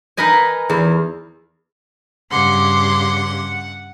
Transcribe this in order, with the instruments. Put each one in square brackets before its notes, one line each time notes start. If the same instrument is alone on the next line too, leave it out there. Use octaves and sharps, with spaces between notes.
[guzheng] D#4 A#4 B4 D#5 G#5
E2
[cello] G2 C#3 [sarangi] F#5 [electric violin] C6 D6